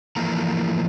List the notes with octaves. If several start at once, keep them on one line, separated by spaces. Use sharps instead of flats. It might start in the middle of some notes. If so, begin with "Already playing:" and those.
E3 F3 A#3 E4 A4 A#5